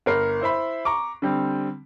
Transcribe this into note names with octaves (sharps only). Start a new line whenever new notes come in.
G1 A#4 C7
E4 C5 E5 B5
A#5 C#6 D6
D3 G3 C4